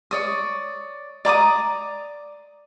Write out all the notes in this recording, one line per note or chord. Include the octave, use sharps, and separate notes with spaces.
C#5 D5 D#6
D5 A#5 D6 D#6